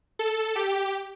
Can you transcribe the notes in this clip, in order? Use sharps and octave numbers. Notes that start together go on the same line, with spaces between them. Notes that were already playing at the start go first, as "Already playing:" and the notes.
A4
G4